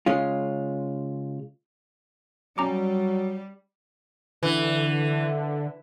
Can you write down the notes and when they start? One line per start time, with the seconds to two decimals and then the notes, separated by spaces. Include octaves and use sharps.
0.06 C#3 G#3 C#4 F4
2.58 F#3 G3 C#4 A#5 D6
4.43 D3 E3